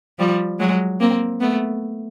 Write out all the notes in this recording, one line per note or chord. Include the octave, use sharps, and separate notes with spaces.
F3 G3
F#3 G#3
A#3 C4
A3 B3